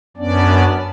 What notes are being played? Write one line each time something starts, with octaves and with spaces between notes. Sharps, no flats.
F#2 B3 C#4 D4 D5